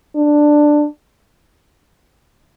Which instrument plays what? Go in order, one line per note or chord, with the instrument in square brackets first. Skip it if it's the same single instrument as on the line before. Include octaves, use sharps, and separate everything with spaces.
[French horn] D4